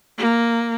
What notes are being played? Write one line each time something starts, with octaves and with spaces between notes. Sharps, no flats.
A#3